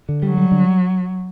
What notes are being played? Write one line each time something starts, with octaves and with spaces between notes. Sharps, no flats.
D3
F#3 G3
G3
D3